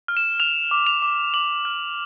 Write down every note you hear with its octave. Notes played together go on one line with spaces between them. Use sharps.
F6
E7
F6 F7
D6
F7
D6
D6 F#7
F6